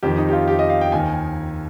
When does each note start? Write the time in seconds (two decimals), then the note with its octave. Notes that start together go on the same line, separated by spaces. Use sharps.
0.03 F2 D#3 G4
0.18 D#4
0.29 G4
0.33 F4
0.48 G4
0.59 D#5
0.70 F5
0.81 G5
0.92 D#2 D#3 G#5